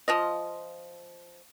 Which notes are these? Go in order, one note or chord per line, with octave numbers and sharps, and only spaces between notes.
F3 F4 D#5